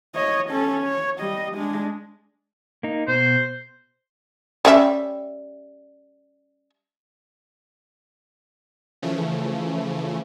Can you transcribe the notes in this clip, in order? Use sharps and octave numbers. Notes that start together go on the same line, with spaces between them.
C#5 D#5
C#4 A4
C#5
G3 D#5
G#3 D4
A#3 D#4
B2 C5
G3 C#4 E5
C#3 E3 F3 A3